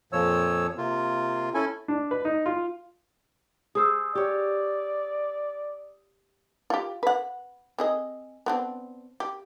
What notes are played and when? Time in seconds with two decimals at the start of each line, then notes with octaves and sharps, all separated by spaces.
0.13 F2 A#2 F3 C#5 E6
0.78 C3 A#3 F4
1.54 C#4 E4 A4 G#5
1.88 D4
2.11 B4
2.25 D#4
2.46 F4
3.75 G#4 C5 D#6 E6
4.15 G4 C#5 D5
6.70 F4 G4
7.03 B4 F#5
7.78 C4 G#4 D#5
8.46 B3 C4 D4
9.20 G4